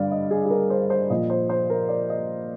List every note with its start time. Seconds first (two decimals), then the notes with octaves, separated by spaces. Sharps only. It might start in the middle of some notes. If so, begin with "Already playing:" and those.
Already playing: G2 D3 G3 D5 F5
0.11 D#5
0.31 G#4
0.46 G#4
0.50 A#4
0.70 C5
0.90 C5
1.10 A#2 F3 D#5
1.30 C5
1.49 C5
1.70 A#4
1.89 D5
2.10 D#5